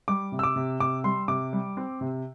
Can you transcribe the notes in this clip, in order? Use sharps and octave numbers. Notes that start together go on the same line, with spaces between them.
G3 D6
C3
E6
D6
C3
C3 D6
G3 C6
C3 D6
G3
C4
C3